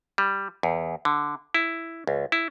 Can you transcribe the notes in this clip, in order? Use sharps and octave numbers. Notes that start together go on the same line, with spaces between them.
G3
E2
D3
E4
C#2
E4